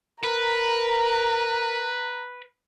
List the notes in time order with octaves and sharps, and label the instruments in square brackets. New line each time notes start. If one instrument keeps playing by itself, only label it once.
[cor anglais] A#4 [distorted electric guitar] B4 [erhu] A#5